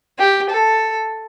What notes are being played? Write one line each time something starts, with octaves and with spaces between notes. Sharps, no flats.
G4
A4